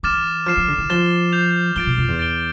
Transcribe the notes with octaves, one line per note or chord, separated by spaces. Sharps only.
E3 D6 F6 A6 E7
F3 F6 C7 E7
F3
D3
E3
F3 A6 E7 G7
G6 C7 F7
F3 A6 D7 G7
B2
F2
E2
A6 D7 G7